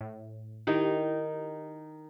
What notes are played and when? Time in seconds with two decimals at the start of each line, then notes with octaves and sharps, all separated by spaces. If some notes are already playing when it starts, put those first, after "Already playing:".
0.01 A2
0.67 D#3 D#4 E4 G4